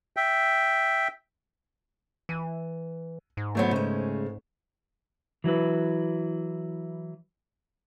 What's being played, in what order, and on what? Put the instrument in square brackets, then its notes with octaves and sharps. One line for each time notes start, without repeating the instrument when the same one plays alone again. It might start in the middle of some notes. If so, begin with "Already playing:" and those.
[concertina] E5 G5
[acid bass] E3 [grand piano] D#7
[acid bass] G#2
[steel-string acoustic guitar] D3 F#3 B3 [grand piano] A3 C5 C#5
[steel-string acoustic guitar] C#3 G#3
[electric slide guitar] E3 F#3 E4 B4